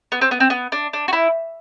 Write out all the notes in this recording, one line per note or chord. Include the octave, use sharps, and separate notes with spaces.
B3
C4
B3
C4
B3
D4
D4
F#4
E4